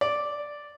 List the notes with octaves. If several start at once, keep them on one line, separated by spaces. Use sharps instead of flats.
D5